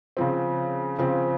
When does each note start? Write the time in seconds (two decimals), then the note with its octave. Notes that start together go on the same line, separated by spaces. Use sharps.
0.17 C#3 F3 C4
0.98 C#3 F3 C4